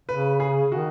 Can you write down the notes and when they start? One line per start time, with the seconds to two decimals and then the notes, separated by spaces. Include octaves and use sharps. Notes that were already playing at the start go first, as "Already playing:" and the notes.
0.09 C#3 B4
0.40 G#4
0.72 D#3 F#4